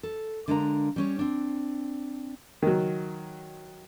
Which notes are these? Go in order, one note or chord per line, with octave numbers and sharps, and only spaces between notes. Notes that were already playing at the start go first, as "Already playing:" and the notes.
A4
D3 G#3 D4 A#4 F5 A#5
G3 C#4 C#5
C4 D4
D#3 F#3